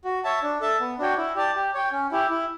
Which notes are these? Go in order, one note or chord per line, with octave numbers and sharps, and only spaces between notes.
F#4
C#5 E5 A5
D4
A4 E5 A5
B3
D4 F#4 C#5 G5
E4
G4 D5 A5
G4
C#5 G5
C#4
E4 G4
E4